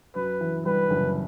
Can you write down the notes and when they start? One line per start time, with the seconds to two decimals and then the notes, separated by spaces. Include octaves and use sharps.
0.15 F#2 B4
0.40 E3
0.65 G3 B4
0.90 F#1